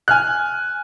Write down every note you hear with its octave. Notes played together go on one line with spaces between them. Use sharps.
G#5 F6 F#6